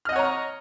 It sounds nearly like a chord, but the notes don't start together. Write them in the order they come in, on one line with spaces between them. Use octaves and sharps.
F6 D#5 F#5 C#5 A#5